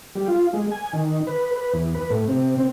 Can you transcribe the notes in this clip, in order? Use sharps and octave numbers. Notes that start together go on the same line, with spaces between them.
G3
F4
G#3
G#5
D#3
B4
B4
E2
B4
A2
C3
C4